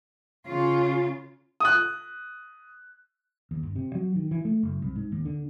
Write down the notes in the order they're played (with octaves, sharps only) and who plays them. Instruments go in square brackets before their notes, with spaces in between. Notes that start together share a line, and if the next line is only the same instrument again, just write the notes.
[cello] C#3 F4
[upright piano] D#6 F#6
[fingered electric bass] D#2
G1
C3
F#3
D#3
E3
A3
F#1
C2
G#2
D#2
D3